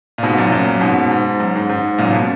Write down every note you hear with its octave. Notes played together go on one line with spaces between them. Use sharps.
A#2
G#2 B2
F#2 A#2
F#2 A#2
G#2 B2
G#2
F#2
G#2
G#2
F#2 A#2
A#2
B2